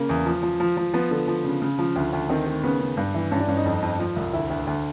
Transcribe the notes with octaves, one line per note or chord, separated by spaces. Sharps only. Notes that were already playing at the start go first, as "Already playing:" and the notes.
Already playing: C#3 A#3
E2
F3
F3
F3
F3
F3 B3
D3
F3
C#3
C#3
F3
D2
D2
D#3 C4
D#3
C#3 B3
C#3
G2
E3
G2 C#4
D4
G2 C#4
D#4
F2
F2
F3
C2
D2 E4
D2
D2